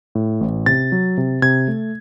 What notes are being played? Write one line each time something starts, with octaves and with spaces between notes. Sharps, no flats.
A2
A1
C3 A6
F#3
C3
C3 G#6
A3